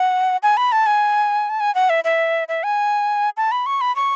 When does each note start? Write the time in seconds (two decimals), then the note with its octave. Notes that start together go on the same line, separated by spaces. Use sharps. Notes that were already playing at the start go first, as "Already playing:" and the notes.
Already playing: F#5
0.43 G#5
0.57 B5
0.72 A5
0.86 G#5
1.49 A5
1.60 G#5
1.75 F#5
1.90 E5
2.04 E5
2.49 E5
2.63 G#5
3.37 A5
3.52 B5
3.66 C#6
3.81 B5
3.96 C#6